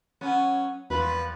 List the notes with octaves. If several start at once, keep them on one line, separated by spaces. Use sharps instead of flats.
F#3 B3 C#4
E2 A#2 F3 G3 B4